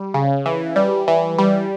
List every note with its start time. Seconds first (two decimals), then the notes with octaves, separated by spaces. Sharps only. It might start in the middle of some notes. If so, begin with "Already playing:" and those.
Already playing: G3
0.14 C#3
0.46 E3
0.76 G3
1.08 E3
1.38 G3